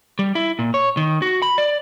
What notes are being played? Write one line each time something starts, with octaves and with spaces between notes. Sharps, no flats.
G3
E4
A#2
C#5
D#3
F#4
B5
D5